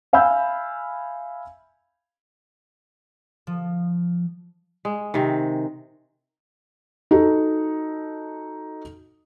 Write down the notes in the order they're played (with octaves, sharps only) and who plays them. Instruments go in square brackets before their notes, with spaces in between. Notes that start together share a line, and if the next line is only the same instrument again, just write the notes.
[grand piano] E5 F5 G#5 B5 E6 G6
[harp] F3
[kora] G#3
C3 D#3
[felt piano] D#4 F#4 A4